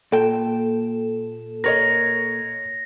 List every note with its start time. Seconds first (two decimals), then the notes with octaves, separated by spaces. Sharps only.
0.13 A#2 A4 G5
1.64 A#4 C#5 D#5 A#6